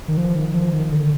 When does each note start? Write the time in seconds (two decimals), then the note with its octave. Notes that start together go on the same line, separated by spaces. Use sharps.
0.08 D#3
0.17 F3
0.36 D#3
0.55 F3
0.73 D#3
0.92 D3